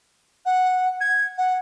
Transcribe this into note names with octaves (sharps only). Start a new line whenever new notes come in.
F#5
G#6
F#5